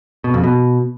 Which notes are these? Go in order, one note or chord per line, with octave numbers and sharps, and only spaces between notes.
B2
F2
B2